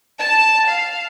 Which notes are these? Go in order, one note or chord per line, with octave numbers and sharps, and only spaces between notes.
A5
F5